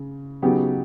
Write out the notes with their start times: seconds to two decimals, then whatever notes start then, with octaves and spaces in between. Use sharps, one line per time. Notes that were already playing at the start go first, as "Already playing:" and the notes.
Already playing: C#3
0.42 C#3 F#3 B3 D#4 G4